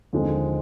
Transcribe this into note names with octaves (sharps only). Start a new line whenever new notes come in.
D#2 D3 F3 G#3 C4